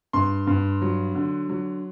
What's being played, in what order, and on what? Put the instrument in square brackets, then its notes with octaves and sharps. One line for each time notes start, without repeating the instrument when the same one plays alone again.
[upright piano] G2 C6
G2
F#3
D3
F#3